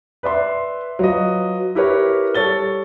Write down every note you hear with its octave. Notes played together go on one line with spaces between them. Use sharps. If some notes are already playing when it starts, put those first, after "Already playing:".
B4 D5 E5 C6
F#3 F4 B4 D#5
E4 G4 A#4 B4 C#5
G3 A4 C#5 A6 G7